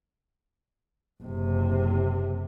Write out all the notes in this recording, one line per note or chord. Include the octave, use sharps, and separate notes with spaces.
F#1 C3